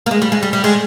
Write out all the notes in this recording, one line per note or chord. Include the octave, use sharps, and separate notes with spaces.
A#3
G#3
G3
G#3
G3
G3
G#3